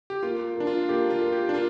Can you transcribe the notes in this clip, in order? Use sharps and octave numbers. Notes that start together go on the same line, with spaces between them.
G4
A#3 F4
D4 A#4
F4
A#3 G4
F4
A#4
G4
D4
F4 A#4